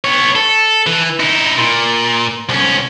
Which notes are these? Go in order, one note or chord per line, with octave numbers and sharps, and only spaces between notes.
B3 C#5
A4
E3
D#4 E4
A#2
C2 C#4